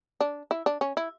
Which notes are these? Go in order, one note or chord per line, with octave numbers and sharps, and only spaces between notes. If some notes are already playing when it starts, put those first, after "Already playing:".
D4
E4
D4
C#4
E4